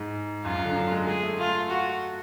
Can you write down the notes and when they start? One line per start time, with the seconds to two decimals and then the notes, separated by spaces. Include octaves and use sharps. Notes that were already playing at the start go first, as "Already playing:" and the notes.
Already playing: G#2
0.44 F#2 F4
0.55 F#2
0.65 D3
0.76 F#3
0.92 G#3
1.07 G#3 G#4
1.23 A3
1.38 F4
1.70 F#4